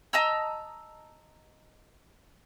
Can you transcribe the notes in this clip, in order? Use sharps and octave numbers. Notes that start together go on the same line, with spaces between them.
D#5 A5 A#5 E6